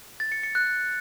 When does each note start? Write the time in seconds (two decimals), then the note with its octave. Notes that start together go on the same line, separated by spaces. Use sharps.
0.20 A6
0.32 C#7
0.43 C#7
0.55 F#6